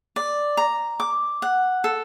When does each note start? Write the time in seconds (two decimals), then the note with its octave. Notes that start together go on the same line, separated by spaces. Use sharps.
0.16 D5
0.57 A#5
1.00 D6
1.42 F#5
1.84 A4